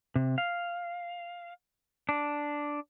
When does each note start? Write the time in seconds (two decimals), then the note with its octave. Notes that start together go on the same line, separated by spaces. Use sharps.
0.16 C3
0.38 F5
2.09 D4